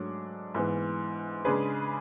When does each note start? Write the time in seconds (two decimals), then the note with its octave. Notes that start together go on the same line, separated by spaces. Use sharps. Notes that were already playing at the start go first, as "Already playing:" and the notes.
Already playing: G#2 F#3 A3 D4
0.55 G#2 E3 B3
1.45 C#3 G#3 D4 G#4 B4